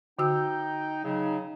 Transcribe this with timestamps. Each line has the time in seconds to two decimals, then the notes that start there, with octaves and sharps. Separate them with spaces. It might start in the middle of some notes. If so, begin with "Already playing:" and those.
0.19 D3 D#4 F#4 G5 E6
1.04 C#3 F#3 D#4